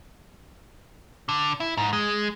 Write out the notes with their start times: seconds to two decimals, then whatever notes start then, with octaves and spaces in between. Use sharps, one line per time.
1.29 D3
1.60 E4
1.77 G#2
1.93 G#3